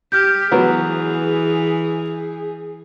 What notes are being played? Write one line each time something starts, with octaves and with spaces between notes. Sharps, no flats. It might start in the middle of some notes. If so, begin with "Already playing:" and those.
G4 F6 G6
E3 F#3 B3 G#4